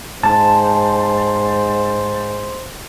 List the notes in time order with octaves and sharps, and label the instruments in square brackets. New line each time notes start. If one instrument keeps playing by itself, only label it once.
[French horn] G#2 [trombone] C5 [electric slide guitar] A5